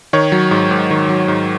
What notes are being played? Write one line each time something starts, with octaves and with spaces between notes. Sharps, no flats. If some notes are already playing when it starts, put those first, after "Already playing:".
D#3 C#5
F#3
G#2
G#2
D#3
F#3
G#2